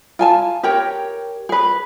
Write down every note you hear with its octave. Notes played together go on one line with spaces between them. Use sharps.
F4 G#5 A5
G4 A#4 C#5 G5
G#4 B4